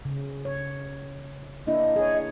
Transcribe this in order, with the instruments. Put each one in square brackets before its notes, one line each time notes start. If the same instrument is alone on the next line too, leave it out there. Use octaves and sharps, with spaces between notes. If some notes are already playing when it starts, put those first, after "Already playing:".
[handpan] C#3
C#5
[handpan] A#3 D4 E4 [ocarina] D#5
[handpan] G#4 C#5